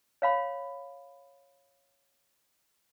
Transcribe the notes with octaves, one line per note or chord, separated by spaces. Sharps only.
C#5 F5 B5